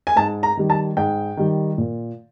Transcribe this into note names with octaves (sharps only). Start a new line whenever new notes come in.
G#5
G#2 A5
A#5
D#3 G3
A5
G#2 G5
D#3 G3
A#2